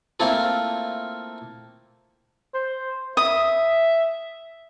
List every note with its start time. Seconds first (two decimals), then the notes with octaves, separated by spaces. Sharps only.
0.20 A3 A#3 C4 E4 F4 A4
2.54 C5
3.17 E5 D#6